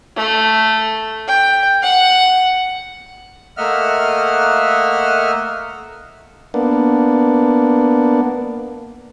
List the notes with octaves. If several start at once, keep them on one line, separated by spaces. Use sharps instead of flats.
A3
G5
F#5
A3 A#3 D#5 E5 F#5 F6
A#3 B3 D4